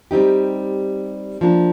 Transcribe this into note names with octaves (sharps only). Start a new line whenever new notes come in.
G3 C4 D#4 G4
F3 A#3 D4